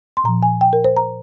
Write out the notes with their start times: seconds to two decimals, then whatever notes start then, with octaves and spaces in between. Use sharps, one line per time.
0.17 C6
0.24 A#2 A#5
0.28 F3
0.43 G#5
0.61 G5
0.73 A#4
0.84 C5
0.97 A#5